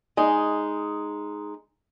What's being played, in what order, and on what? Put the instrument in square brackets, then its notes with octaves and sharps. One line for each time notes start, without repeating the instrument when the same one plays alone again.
[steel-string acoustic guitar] G#3 D#4